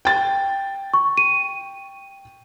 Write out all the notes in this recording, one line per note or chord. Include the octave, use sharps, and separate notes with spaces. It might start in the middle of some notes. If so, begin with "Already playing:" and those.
G5 A6
C#6
D#7